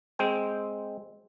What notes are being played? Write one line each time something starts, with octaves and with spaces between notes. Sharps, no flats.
G#3 C4 G5